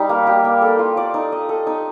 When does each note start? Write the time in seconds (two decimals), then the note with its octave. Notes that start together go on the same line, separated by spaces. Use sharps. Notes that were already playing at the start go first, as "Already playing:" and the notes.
Already playing: G3 D#4
0.09 A#3
0.27 G4
0.44 A#3
0.62 A4
0.79 F4
0.97 D5
1.14 D#4
1.32 D#5
1.49 A4
1.67 D#4